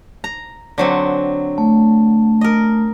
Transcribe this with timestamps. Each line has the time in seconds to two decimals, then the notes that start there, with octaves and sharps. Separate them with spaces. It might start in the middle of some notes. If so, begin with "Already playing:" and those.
0.24 A#5
0.78 D3 F#3 C4
1.58 A3
2.41 A#4 D#5